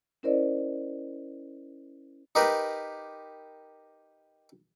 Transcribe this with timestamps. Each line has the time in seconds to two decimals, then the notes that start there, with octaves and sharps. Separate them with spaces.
0.23 C#4 E4 A#4 C5 D5 D#5
2.35 D#4 G4 A#4 B4